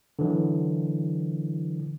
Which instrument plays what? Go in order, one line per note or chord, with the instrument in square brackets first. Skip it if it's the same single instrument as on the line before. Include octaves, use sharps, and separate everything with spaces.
[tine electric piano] D3 E3 F#3